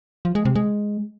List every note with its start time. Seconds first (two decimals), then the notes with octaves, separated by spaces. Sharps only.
0.25 F3
0.35 G#3
0.45 C3
0.55 G#3